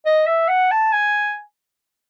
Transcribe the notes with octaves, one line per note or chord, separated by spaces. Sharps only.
D#5
E5
F#5
A5
G#5